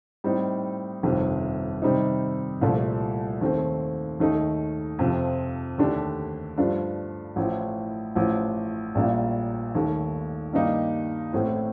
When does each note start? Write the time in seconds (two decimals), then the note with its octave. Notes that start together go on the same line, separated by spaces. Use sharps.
0.24 A2 G3 C4 D#4
1.03 G1 F2 C3 D#3
1.82 C3 D#3 G3 C4 D#4
2.61 C2 A#2 F3 A3
3.41 D#2 D#3 A3 C4
4.20 D#2 D#3 A3 D#4
4.99 F2 C3 F3
5.78 D#2 D3 A3 D4 G4
6.58 G2 F3 A3 D4 F4
7.36 A1 A2 F3
8.15 A1 A2 F3
8.95 A#1 A#2 G3 A#3
9.75 D#2 D#3 A3
10.53 G2 D#3 A#3 D#4 G4
11.33 A1 A2 A3 C4